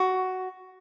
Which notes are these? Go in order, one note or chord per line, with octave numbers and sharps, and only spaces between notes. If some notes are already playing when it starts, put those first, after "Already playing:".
Already playing: F#4